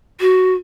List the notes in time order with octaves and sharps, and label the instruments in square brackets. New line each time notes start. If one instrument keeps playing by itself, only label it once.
[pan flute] F#4